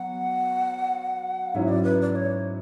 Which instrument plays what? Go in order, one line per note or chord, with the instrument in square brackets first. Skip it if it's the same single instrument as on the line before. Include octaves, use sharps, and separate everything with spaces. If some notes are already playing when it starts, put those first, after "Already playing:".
Already playing: [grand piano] F#3 B3 [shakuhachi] F#5
[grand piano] G#2 F#3 C#4 E4 [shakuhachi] E5
[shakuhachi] D5
B4
D5
D5
C#5